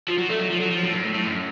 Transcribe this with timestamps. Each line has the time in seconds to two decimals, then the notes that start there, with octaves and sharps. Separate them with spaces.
0.09 F3
0.18 F#3
0.30 A3
0.39 F#3
0.51 F3
0.61 F#3
0.71 F3
0.83 A2
0.93 F#2
1.04 A2
1.14 A2
1.25 F#2